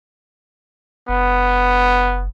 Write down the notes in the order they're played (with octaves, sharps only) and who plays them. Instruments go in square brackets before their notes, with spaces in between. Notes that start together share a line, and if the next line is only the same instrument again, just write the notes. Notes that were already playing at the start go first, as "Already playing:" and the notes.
[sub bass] F#1 [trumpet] B3